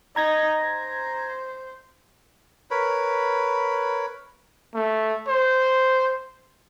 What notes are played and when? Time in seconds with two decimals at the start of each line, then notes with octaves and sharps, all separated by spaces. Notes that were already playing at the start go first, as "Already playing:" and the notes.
0.16 D#4 A#5 G#6 A#6
0.59 C5
2.71 A#4 B4 C#5 B5
4.74 A3
5.28 C5